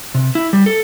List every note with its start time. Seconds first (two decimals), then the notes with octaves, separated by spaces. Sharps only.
0.15 C3
0.35 E4
0.53 G3
0.66 A4